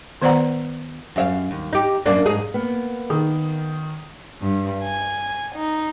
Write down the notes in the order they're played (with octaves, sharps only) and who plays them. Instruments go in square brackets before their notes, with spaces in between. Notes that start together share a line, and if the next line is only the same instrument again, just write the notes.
[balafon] D#3 B3 C5 D5 F#5 A#5
[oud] F#2 E5 F5
D#2
D#4 G4
F#2 A#3 D4
G#2 D#4 G#4
[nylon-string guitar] A#3 B3
[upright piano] D#3
[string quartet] G2
G#5
D#4